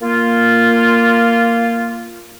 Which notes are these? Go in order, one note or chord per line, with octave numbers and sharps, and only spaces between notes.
A#3 F4